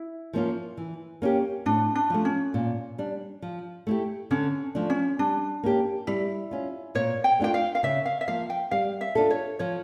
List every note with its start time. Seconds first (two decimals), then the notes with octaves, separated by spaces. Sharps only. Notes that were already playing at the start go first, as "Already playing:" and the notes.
Already playing: E4
0.33 F3 A#3 C#4 F4
0.78 E3
1.22 A#3 C#4 G4
1.66 A2 D4
1.95 D4
2.10 F3 A3
2.25 C#4
2.54 A#2
2.98 G3 D4
3.42 F3
3.87 A3 E4 G4
4.31 D3 C#4
4.75 F3 A3 D4
4.90 C#4
5.19 G3 D4
5.63 A#3 C#4 G4
6.07 G3 E4
6.51 C#4 F4
6.95 A#2 C#5
7.24 G5
7.39 A3 D4 F4 G5
7.54 F5
7.75 F5
7.83 C#3 E5
8.06 F5
8.21 E5
8.28 F3 A#3 F5
8.50 G5
8.71 G3 F5
9.01 E5
9.15 D4 F4 A4
9.31 C#5
9.59 F3 C#5